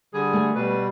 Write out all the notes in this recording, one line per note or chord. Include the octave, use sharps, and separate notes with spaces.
D3 G3 G#4
A3 G#5
B2 G3 B4